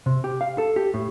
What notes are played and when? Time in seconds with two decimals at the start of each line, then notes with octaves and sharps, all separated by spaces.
0.06 C3
0.24 G4
0.41 F5
0.58 A4
0.76 G4
0.94 A2